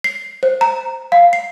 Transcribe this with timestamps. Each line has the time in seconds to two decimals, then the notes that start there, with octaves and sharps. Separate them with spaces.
0.04 C7
0.43 C5
0.61 A#5
1.12 F5
1.33 C7